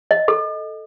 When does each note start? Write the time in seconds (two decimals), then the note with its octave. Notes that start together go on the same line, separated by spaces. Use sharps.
0.11 D#5
0.28 A4